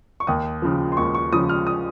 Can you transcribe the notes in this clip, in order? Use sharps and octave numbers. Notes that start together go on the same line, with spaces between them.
C#6
D#2 D#6
C#3 F3
C6
D#2 C#6
C#6
C#3 F3 D#6
F6
D#6